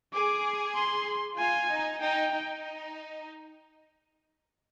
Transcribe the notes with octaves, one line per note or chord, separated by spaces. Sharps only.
G#4 D6
C6
F4 G#5
D#4
D#4 G5
D#4